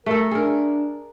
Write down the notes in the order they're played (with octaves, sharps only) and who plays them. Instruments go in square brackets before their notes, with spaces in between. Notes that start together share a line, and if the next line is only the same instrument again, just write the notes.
[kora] A3 A4 [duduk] A#4
[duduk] D4 [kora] G#4 A#4